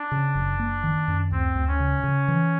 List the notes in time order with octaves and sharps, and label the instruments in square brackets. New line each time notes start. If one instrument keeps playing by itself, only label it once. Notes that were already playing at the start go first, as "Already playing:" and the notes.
Already playing: [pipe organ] D4
[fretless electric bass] C#3
F#1
A#3
D#3
F#2
[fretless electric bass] D2 [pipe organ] C4
[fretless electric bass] D2
[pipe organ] C#4
[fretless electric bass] C#3
C#3
E3